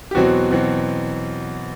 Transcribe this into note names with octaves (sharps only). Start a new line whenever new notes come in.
G4
E2 B2 F#3 C4 F#4
E2 B2 F#3 C4